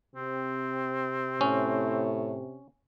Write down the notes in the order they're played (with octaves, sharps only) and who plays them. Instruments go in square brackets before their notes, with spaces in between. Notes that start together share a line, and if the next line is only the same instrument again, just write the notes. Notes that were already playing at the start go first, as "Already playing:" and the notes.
[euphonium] C3 [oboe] C4
[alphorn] A2 [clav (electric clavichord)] C#4